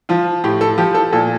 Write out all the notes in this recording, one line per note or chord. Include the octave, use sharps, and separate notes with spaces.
F3 F4
A2 G4
A4
F3 G4
A4
A#2 A4